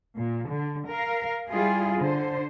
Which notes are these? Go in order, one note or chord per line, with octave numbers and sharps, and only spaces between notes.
A#2
D3
A#4 F5
G3 E4 F4 G#4
D3 C5